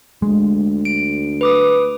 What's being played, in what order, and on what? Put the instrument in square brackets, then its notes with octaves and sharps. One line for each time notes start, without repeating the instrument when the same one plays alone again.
[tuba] D2 [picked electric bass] G#3
[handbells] D7
B4 D6 D#6